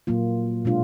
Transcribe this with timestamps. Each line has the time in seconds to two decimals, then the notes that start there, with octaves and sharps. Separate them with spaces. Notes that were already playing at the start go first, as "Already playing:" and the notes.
0.07 A#2 F#3 A#3 F4
0.65 B2 G#3 D4 F4